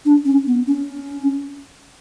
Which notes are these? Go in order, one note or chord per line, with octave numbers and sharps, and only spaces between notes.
D4
C#4
B3
C#4